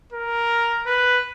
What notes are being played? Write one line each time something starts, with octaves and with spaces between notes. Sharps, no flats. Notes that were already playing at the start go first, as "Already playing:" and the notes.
A#4
B4